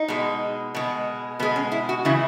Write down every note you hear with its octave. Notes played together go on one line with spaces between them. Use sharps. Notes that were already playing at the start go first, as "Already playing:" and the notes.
Already playing: D#4
B2 G#3
B2 G#3
B2 G#3 B3
C#4
E4
F#4
C#3 E3 G#3 E4